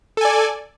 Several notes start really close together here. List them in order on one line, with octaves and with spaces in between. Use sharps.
A4 G#5 D5